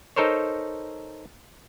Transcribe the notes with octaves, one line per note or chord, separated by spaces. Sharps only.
D#4 A4 A#4 C5 C#5